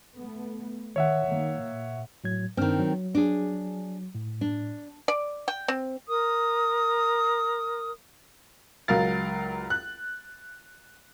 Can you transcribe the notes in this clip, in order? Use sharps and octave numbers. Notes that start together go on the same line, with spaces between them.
A3 B3
D#3 C#5 E5 F#5
D#3 A#3
A#2
A2 F#3 G#6
G2 D#3 C4 D4 F6
F#3
D4 G#4
A2
D4
D5
G5
C4
A#4 D#6
C#2 F#3 A#4 F5 A6
F#6